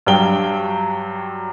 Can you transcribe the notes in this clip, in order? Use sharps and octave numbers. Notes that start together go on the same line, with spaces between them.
G2 F#3 G5 G7